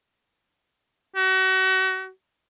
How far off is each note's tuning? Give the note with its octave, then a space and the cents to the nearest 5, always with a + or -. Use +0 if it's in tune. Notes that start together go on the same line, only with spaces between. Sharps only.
F#4 +35